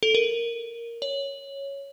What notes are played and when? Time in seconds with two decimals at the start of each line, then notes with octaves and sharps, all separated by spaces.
0.03 A4
0.15 A#4
1.02 C#5